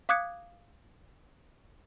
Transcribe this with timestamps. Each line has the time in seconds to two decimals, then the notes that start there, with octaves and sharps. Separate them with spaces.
0.09 F5 D6 D#6 F#6 G#6 C#7